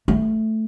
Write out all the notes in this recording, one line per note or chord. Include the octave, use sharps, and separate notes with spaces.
A3